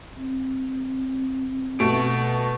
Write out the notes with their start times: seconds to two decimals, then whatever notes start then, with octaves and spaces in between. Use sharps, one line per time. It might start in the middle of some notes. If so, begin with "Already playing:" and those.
0.17 C4
1.79 B2 A3 D7